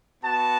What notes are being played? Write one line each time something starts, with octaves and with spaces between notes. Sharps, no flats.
B3 F#4 A5